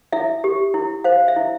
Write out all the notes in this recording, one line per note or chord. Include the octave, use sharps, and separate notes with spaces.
E4 E5
G4
E4
C5 F5
E5
E4